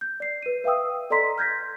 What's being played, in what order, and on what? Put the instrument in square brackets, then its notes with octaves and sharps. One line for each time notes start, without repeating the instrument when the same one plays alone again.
[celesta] G6
D5 C7
B4 D#7
B4 E5 F5 G5 D#6 E6
A4 D5 D#5 A#5 C6 B6
F6 G6 G#6 A#6 B6